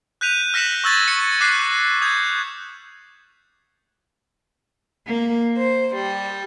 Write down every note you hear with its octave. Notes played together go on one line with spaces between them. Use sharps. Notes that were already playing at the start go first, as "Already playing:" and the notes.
F#6 G6 B6 D#7 F7
F6 A#6 B6 C#7 E7 F#7
C#6 E6 G#6 A6 F#7
C#7
D6 F#6 B6 C7
D#6 G6 G#6
A#3
C5
G3